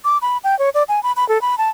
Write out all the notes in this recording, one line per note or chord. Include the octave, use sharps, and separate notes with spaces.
D6
B5
G5
C#5
D5
G#5
B5
B5
A4
B5
A5